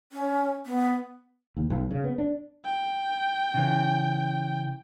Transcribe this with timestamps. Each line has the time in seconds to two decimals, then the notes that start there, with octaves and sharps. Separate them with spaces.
0.12 C#4
0.66 B3
1.57 D#2
1.70 B1
1.91 C#3
2.04 B3
2.18 D4
2.65 G5
3.54 C#3 E3